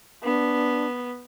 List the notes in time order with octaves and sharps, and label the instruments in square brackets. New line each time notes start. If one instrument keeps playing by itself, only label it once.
[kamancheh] B3 [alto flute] D4